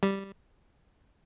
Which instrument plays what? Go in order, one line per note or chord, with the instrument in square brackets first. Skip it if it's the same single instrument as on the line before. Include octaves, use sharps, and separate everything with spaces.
[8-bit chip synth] G3